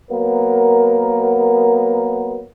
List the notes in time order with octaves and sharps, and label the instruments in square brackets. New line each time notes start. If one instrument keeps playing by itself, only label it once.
[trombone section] F#3 A#3 B3 A#4